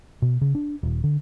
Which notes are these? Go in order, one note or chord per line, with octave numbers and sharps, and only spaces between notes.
B2
C#3
D4
D#1
D3